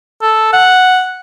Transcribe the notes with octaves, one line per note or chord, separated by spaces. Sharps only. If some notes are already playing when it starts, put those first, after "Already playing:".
A4
F#5